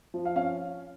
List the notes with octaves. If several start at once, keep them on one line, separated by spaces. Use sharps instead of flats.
F3
F5
C#4 F5